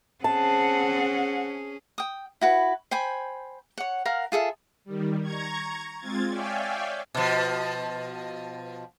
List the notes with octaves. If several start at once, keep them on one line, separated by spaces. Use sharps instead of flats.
C4 C#4 G#4 F#5 A5
G5 D#6
E4 F#4 B4
C5 G5 G#5 B5
C#5 F#5
A#4 F5 F#5
F4 G#4 A4 E5
D#3 G3
A#5 C#6 G#6
G#3 C4 F4 G#6 A6
C#5 D5 E5 F5 G5 G#5
B2 F3